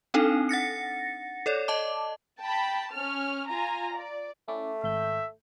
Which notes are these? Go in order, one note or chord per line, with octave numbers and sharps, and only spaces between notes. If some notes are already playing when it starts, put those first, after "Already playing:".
C4 D4 D#4 A4
F#5 A6 A#6 C#7
A4 C#5 D5
D#5 A5 D6
G5 A5 B5
C#4 F6
F4 G#5 A#5
D5
A3 C#4 E4 D5
G#1 E5 G6